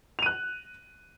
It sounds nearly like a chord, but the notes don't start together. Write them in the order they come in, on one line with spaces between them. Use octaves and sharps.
F7 D#7 F#6